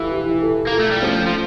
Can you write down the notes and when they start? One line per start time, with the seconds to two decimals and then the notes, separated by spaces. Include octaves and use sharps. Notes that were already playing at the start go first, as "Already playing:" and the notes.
Already playing: E3 F4 G4 A4
0.11 E4 G4
0.42 F4 A4
0.67 A#3
0.72 F4 A4
0.80 A3
0.91 G3
1.03 F3 A3 C#4
1.27 F3